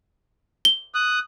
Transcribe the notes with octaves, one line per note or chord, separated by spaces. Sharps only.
G7
D#6 F#6